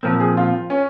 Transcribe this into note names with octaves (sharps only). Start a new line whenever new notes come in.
A#2 F3 C4 A#4
G#4
F4
C#4